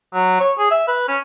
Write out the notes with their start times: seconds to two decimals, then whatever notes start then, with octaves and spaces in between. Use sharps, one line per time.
0.14 F#3
0.40 C#5
0.58 G#4
0.71 E5
0.88 B4
1.08 C#4